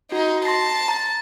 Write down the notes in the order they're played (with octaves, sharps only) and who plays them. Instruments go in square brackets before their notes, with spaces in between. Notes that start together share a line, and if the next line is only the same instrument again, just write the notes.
[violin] D#4 [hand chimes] F#4
[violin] A5 [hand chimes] C6 A#6 C7
[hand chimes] A#5 A6